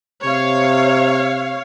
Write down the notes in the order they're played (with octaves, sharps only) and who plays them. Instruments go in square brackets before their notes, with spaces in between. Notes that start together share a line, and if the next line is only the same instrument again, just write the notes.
[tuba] C3 [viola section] C#5 F5